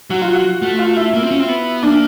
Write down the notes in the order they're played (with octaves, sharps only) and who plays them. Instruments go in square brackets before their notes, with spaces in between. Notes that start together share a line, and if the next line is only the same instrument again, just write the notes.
[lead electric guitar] F#3 [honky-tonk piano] F#4
[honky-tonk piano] F4
F#4
[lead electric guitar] A3
[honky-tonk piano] F4
E4
[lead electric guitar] A#3
C4
C#4
C4
B3
[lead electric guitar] A#3 [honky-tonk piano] D4